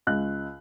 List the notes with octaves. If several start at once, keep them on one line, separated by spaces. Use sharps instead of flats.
C#2 F#6